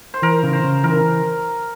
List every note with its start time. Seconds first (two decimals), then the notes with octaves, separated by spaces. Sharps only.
0.14 C5
0.22 E3 A#4
0.43 C#3
0.53 C5
0.64 C#3
0.83 E3 A#4